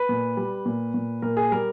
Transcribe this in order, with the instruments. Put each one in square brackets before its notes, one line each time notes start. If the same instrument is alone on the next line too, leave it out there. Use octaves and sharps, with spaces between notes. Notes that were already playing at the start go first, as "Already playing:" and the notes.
Already playing: [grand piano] B4
A#2
G3
A#2
A#2
A#2 A#4
G#4
G3 A#4